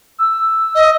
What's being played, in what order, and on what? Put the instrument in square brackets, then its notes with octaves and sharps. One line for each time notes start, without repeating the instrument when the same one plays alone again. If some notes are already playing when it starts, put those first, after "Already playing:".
[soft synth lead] E6
[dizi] D#5